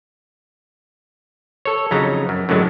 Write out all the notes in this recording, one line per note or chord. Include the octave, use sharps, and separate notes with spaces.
A4 C#5
F2 C#3 F#3 D#4 A#5
F#2
F#2 A2 D3 F#3 G#3